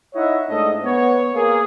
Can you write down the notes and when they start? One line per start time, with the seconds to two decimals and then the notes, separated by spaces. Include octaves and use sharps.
0.15 D#4 E4 C#5 D#5 E5 F#5
0.49 G#2 A3 D4 A4 D#5
0.84 B3 C#5
1.34 A#3 G#4